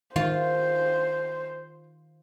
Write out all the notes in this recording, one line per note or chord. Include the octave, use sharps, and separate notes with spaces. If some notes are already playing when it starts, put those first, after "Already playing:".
D#3 F4 C5